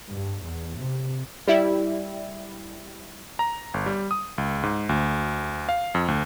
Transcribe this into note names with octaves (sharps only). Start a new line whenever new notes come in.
G2
E2
C3
G3 E4
A#5
G1
G3
D#6
C#2
G#2
D2
F5
F2
D2